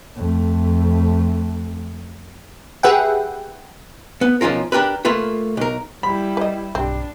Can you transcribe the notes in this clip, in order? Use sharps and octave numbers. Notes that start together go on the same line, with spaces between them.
F2 A3
G4 G#4 B4 E5 F#5 G5
B3
B1 F3 C#4 F4 A#4
D4 G4 A#4 B4
A3 A#3 F4 B4
B1 A#4
G3 E4 B5
B4 D#5
B1 G2 C4 D4 G4